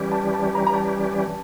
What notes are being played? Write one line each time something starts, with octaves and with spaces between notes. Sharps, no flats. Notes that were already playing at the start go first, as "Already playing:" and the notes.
Already playing: E3 G3 C#4 G4
A5
A5
A#5
A#5
A5